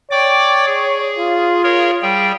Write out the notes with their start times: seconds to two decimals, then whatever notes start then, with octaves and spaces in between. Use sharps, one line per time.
0.11 C#5 D5 G5 D6
0.66 G#4
1.18 F4
1.64 G#4 A#4 C#5
2.02 G3 G#4 G5